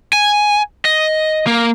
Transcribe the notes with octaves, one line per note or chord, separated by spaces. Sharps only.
G#5
D#5
A#3